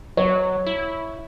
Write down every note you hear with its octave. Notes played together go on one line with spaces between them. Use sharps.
F#3 C#5
E4